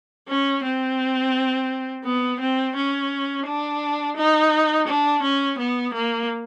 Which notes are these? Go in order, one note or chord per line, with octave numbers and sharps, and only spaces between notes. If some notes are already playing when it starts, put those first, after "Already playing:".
C#4
C4
B3
C4
C#4
D4
D#4
D4
C#4
B3
A#3